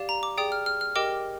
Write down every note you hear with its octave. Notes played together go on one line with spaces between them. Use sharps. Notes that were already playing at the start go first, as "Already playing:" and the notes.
Already playing: G4 D5 F5
A#5
D6
G#4 D5 G5 D#6
F6
F6
F6
G4 A#4 D#5 G5 D6